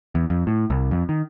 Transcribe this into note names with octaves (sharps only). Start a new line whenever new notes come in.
E2
F2
A2
C2
F2
D#3